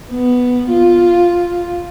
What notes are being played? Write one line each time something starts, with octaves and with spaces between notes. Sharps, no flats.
B3
F4